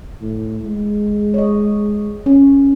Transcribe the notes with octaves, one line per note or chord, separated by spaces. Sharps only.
A2
G#3
C#5 D#5
C#4